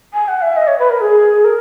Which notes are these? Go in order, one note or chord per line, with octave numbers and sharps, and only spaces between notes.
G#5
F#5
E5
D#5
C#5
B4
A#4
G#4
A#4